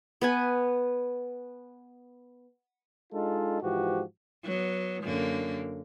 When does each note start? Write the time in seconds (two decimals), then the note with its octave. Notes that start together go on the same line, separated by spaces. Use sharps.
0.21 B3 B4 G#5
3.13 G#3 D4 D#4 F4 A4
3.61 G#2 E3 F3 F#4 G4
4.44 F#3 B3
5.04 F#2 D3 A#3